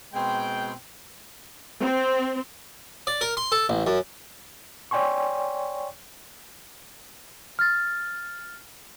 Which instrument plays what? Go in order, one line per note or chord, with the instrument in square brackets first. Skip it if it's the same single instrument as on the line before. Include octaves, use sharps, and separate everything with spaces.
[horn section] B2 G#3 C4 G5
[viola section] C4
[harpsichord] D5
A#4
C6
A4
A1
F#2
[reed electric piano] C#5 D5 G5 G#5 C6 C#6
[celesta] F6 A6